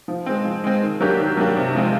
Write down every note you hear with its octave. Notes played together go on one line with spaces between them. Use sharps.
F3
G#3 C4
F3
G#3 C4
D#3
F#3 A#3 D4 G4
D#3
F#3 A#3 D4 G4
C3
F3 G#3 C4 F4